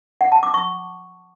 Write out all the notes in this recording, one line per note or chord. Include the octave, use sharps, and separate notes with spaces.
F#5
A5
D6
C#6